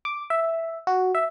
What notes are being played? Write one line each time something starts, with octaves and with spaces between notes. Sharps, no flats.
D6
E5
F#4
E5